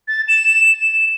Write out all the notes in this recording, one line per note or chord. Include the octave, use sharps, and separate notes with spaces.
A6
E7
E7